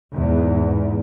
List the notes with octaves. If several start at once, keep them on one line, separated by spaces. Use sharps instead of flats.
E2 G#2